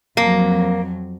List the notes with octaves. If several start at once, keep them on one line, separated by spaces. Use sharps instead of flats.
F2 F#3 A#3